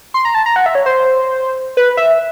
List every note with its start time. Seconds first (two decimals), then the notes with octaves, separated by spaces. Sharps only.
0.14 C6
0.25 A#5
0.35 A5
0.46 A#5
0.56 F#5
0.66 E5
0.75 C#5
0.86 C5
1.77 B4
1.97 E5